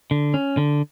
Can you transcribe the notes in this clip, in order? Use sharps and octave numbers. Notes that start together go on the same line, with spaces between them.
D3
C#4
D3